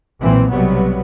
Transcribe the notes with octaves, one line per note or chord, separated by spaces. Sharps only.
B1 A#2 E3 C4
B1 C3 F#3 G3 B3